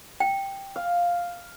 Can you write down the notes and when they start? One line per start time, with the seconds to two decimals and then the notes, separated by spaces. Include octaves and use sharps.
0.20 G5
0.76 F5